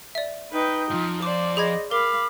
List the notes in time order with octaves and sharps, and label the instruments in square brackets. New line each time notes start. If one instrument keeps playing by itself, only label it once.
[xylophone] D5 E5
[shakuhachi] D#4 [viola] B4 G5
[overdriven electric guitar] F2 G#2 [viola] F4
[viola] C5 D5 [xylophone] D6
[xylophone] G#4 B5 G#6 [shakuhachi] D#5
[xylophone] A#4 [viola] F5 B5 [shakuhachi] D6